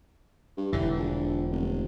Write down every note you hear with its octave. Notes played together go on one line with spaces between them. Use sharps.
G2
E1 D3 E3
A#1
F1